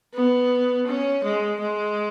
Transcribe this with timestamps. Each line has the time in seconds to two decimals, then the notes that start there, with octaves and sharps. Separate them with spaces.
0.14 B3
0.87 C#4
1.24 G#3
1.60 G#3